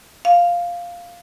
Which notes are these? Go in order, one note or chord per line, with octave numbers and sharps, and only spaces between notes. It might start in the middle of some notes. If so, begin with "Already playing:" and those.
F5